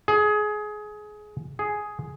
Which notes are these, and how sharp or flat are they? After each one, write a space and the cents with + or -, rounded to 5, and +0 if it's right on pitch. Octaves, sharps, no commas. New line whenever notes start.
G#4 +20
G#4 +5